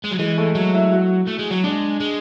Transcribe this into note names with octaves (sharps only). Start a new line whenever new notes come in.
G#3
F#3
E3 G#3
A3
F#3
E4
F#4
A3
G#3
F#3
G#3 D4
G#3